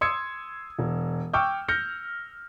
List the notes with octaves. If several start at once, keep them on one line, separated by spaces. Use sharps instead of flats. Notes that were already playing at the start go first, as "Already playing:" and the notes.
C6 D#6 E6 G#6 C#7
E1
G5 C#6 D6 E6 F6 G6
F6 G6 A#6 C#7